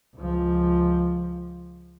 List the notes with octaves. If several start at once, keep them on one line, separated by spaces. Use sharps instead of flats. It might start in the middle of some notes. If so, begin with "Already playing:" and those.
C#2 F3